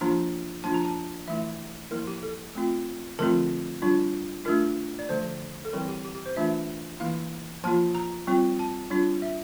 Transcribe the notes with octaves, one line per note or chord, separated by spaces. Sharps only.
F3 A#3 D4 F4 A#5
F3 A#3 D4 F4 A5
A#5
A5
E3 A3 E4 E5
F3 A#3 E4 A#4
G4
A4
A3 C4 F4
D3 F3 A3 C4 F4 A#4
G3 D4 F4
A3 D4 F4 A#4
D5
D3 F3 A3 C5
A4
E3 G3 C4 E4 A#4
G4
G4
G4
C5
E3 A3 D4 F4 E5
E3 A#3 E4 F5
F3 A#3 F4 A5
A#5
G3 C4 F4
A5
G3 D4 F4
E5